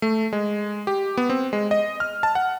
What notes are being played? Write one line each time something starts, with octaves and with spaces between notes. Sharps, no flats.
A3
G#3
G4
B3
C4
G#3
D#5
F6
A5
F#5